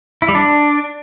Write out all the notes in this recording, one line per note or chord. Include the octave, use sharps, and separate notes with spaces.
E4
G3
D4